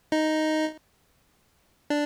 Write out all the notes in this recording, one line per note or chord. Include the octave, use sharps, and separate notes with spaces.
D#4
D4